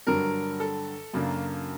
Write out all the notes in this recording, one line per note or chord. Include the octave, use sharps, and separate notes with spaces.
G2 D3 F#3 A#4
A4
F#2 C#3 F#3 A#3 D4